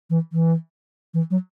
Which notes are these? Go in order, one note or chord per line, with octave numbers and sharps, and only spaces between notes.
E3
E3
E3
F#3